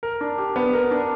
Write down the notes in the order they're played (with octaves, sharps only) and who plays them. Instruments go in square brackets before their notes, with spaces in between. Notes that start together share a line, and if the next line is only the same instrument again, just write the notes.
[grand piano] A#4
D4
G4
B3
A#4
D4